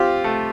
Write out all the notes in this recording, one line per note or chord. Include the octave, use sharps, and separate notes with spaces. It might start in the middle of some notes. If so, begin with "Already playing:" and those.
Already playing: C4 F4 G4
A3